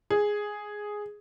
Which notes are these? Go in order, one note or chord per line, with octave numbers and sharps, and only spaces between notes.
G#4